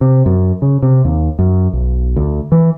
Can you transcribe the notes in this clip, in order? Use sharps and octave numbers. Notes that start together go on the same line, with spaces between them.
C3
F#2
C#3
C3
D#2
F#2
B1
D2
E3